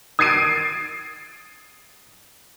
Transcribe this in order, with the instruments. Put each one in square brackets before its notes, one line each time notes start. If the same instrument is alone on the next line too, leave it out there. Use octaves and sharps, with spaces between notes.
[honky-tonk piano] D#6 G#6 A6 C7 D7 D#7